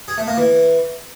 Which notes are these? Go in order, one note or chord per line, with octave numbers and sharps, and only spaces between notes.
G#4
A3
A#3
E3